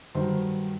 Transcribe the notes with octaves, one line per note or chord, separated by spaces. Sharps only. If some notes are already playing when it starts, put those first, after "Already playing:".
G2 D#3 F#3 C5